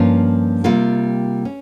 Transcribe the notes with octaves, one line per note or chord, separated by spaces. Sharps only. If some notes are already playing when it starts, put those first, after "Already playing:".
Already playing: G2 F3 A#3 C#4 F4
C3 G3 A#3 F4
C#4